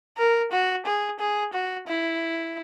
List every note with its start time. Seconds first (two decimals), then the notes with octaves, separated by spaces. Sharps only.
0.18 A#4
0.52 F#4
0.86 G#4
1.19 G#4
1.53 F#4
1.88 E4